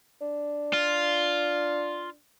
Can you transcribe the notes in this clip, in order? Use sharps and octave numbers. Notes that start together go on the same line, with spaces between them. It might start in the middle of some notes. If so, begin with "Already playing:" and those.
D4
F4